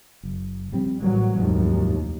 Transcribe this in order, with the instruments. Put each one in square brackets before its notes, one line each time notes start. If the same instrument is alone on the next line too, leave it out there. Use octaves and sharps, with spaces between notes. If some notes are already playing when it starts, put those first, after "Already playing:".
[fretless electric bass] F#1
A#1 G3 C4
[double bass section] A1 F#3 [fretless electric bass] E3 G3 A#3
[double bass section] F1 D#2 F3 [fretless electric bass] A#1 G#2 F#3